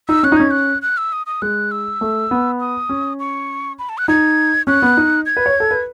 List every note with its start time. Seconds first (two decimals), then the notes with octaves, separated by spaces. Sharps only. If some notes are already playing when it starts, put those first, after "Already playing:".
0.09 D#4 E6
0.23 C#4 F#6
0.32 D#4
0.37 C#4 G#6
0.51 F#6
0.82 F#6
0.97 E6
1.13 D#6
1.27 D#6
1.42 G#3 F#6
1.71 E6
2.01 A3
2.31 B3
2.60 D#6
2.89 C#4
3.20 C#6
3.79 B5
3.89 A5
3.98 F#6
4.08 D#4 G#6
4.67 C#4 F#6
4.82 B3
4.97 D#4
5.26 G#6
5.37 B4
5.46 C#5
5.60 A4
5.71 B4